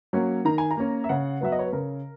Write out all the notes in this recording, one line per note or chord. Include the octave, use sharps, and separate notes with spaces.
F#3 A#3 C#4
D#3 A#5
G#5
A#5
A#3 C#4
E5
C#3 F#5
F#3 B3 E5
D#5
C#5
B4
C#3 A#4